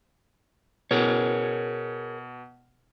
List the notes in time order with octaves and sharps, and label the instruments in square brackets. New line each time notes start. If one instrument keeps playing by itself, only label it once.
[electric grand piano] B2 [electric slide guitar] G#4 A#4 C#5